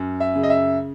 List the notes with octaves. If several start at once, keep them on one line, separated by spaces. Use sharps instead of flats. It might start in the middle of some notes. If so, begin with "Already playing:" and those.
Already playing: F#2
E5
C#3
D#5
E5